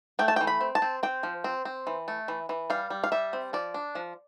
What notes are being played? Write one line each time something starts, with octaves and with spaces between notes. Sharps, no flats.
A3 G5
A5
G5
E3
B5
C4
A5
C4
C4 G5
F3
C4
C4
E3
A3
E3
E3
G3 F5
G3
F5
G3 E5
C4
F3 D5
D4
F3